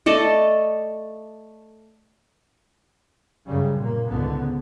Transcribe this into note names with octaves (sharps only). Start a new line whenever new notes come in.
A3 A4 D5 D#5
F#2 C#3 G3
A#2 A#3
C#2 G#2 D3 B3